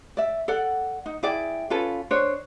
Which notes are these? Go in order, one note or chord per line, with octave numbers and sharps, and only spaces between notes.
D5 E5
A4 D5 F#5
D#4
E4 G#4 D5 G5
C#4 F4 A4 B4
D4 C5 C#5